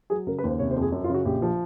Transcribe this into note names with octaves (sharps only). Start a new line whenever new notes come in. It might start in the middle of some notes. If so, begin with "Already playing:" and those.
F#3 G#4
C#3 A#4
B4
D#2
C5
C3 C#5
C5
F2
G#4
F#2
F4
C#3
F#4
A#1 G4
F3